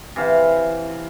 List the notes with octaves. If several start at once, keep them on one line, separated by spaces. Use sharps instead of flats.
C3 E3 F5